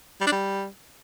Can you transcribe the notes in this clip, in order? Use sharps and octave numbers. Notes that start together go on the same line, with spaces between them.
G3
D4
G3